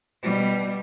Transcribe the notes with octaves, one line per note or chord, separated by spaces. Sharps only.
B2 G3